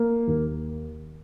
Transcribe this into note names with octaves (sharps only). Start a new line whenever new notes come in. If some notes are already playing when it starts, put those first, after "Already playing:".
Already playing: A#3
D#2